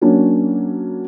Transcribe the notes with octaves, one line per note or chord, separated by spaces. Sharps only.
F#3 A#3 C#4 D4